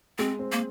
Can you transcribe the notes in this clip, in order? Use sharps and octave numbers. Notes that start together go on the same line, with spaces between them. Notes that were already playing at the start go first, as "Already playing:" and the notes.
G#3 C4
C4
A#3